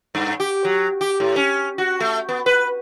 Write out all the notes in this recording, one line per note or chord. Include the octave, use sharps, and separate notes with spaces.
G2
G4
F#3
G4
A2
C#4
F#4
A3
B3
B4